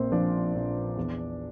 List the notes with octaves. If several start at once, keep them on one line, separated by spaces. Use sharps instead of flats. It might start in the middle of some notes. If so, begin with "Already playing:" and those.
Already playing: A#1 A#2 A#3 C4 A#4 C5
F3 D4 D5
A#1
E2